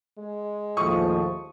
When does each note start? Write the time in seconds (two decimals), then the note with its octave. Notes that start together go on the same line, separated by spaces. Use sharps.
0.19 G#3
0.77 D#2 A2 F3 C#6 D#6